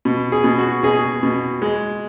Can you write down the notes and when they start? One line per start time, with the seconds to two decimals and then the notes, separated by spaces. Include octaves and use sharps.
0.05 B2
0.32 G#4
0.44 B2
0.58 F#4
0.83 B2 G#4
1.23 B2
1.62 G#3